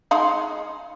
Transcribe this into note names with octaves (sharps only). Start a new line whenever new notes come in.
G#3 D#4 F5